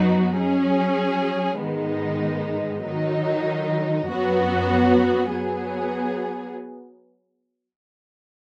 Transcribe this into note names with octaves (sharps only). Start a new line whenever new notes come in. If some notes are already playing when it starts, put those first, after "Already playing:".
Already playing: F#2 F#3 B3 D#4 F#4
F#3 C#4 G#4
G#2 D#3 G#3 B3 D#4
D#3 F#3 D#4
F#2 F#3 B3 F#4
F#3 B3 G#4